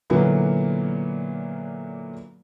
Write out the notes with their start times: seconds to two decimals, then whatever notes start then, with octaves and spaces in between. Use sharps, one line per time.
0.10 A#2 D3 E3 F#3 A#3 B3